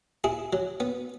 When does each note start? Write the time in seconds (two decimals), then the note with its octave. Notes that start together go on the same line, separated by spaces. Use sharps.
0.24 E4 G#4
0.53 F#3
0.80 B3